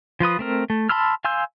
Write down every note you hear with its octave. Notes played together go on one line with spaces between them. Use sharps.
F3 F4 B4 D#6
A3 C4 A#4
A3
A5 B5 C6 E6 F6
F5 G#5 C6 E6 G6